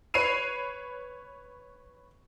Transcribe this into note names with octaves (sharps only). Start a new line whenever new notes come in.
B4 C#5 B5 C7 D#7 F7